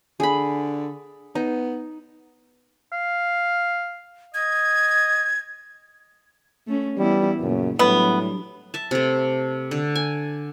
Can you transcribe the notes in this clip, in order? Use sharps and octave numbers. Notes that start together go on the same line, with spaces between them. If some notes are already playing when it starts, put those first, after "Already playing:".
D3 G#4 B5
B3 D#4
F5
D#5 G#6
A3 C#4
E3 G3 B3 E4
F#2 A#2 C#3
A2 F#3 G3 B3 D4
E5 A5
C3 A3
D3
G#5